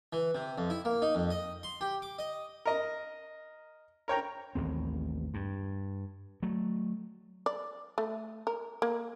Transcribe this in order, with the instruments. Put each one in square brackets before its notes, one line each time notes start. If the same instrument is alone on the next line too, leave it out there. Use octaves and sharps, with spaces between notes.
[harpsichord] E3
C3
F2
E4
A#3
D#4
F2
D#5
C6
G4
D6
D#5
[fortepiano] A#4 D#5
A#4 C#5 G5 A#5
[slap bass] A1 D#2 C4
G2
F#3 A3
[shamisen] D5
A3
A#4
A#3